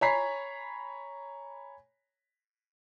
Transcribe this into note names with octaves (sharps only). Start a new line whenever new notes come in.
C#5 G#5 A#5 B5 B6 C7